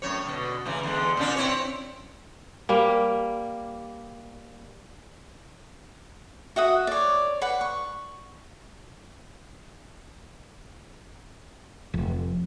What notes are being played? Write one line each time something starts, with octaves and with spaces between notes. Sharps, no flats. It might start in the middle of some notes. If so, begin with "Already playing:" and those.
F#2 A2 C#5
B2 D3
A2 C#3 E3
E2 D3 G#3
A#2 C#4 D4
C4 E4 C#5
G3 A#3
F#4 E5 F#5 D#6
C#5 D5
B4 F#5
C#6
F1